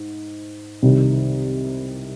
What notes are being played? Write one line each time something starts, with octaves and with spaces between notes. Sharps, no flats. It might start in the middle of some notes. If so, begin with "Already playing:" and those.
Already playing: G#2
C2 C3 D#3 G3